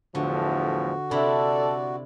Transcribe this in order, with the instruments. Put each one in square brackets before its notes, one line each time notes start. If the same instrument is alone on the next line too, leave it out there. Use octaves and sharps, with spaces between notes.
[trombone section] E2 A2 F3 [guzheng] D3 [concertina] F#4
[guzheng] C3 D4 E4 [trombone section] A4 [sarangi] D5